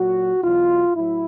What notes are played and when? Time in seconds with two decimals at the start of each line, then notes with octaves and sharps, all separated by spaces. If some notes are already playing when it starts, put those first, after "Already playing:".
Already playing: A#2 F#3 F#4
0.43 E2 B2 F#3 F4
0.94 A2 F#3 E4